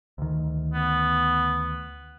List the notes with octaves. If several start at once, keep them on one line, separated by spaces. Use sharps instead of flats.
D2 D#3
B3